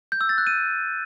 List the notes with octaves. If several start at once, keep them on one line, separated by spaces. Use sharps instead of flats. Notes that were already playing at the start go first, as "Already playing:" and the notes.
G6
E6
A6
F#6
D#7